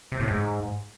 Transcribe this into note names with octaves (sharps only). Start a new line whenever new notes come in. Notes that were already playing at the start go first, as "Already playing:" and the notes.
C3
A2
G#2